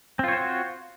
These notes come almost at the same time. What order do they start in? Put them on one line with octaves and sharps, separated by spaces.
C4 F4 C#5 C5 F#4